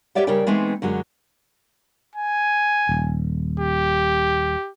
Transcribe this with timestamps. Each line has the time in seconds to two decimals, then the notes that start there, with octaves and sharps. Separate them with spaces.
0.15 G4 B4 C#5 D5 E5 F#5
0.27 C#3 G3 A#4 C#5 D5 G5
0.47 E3 G#3 A3 B3 C4 D#4
0.82 F#2 D3 F#3 G#3
2.16 G#5
2.89 D#1
3.60 G4